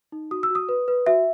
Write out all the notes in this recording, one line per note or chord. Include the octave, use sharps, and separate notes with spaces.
D#4
F#4 D#6
E6
F#4 D#6
B4
B4
F#4 E5